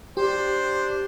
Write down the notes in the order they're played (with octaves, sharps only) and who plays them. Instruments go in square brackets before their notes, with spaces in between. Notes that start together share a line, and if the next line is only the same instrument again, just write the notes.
[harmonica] D4 C5 [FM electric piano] G4